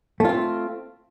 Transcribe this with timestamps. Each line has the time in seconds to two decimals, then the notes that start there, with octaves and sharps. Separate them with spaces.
0.20 A3
0.24 F4
0.29 C4